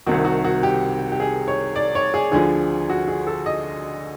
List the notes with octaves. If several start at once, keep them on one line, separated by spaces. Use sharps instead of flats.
C2 C3 D#3 F#4
F#4
F#4
G4
G4
G#4
C#5
D5
C#5
G#4
D2 D3 F3 G#4
F#4
G#4
A4
D#5